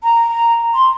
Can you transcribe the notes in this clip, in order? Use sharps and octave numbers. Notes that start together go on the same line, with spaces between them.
A#5
C6